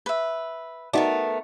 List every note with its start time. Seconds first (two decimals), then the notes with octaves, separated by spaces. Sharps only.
0.06 B4 E5
0.93 A3 B3 D#4 F#4 A#4 D5